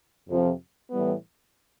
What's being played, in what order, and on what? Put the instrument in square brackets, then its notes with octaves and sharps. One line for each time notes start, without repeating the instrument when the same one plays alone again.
[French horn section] F2 C3 F3
A2 E3 G3 B3